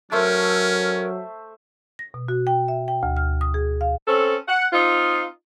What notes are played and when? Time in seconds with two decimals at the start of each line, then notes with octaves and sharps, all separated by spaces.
0.12 F#3 A3 C#4 A#4 C5 E5
1.99 A#6
2.14 B2
2.28 F#4
2.47 G5
2.68 E5
2.88 G5
3.03 D2
3.17 F6
3.41 D#6
3.54 G#4
3.81 F5
4.07 C4 C#4 A4
4.48 F#5
4.72 C4 D#4 F4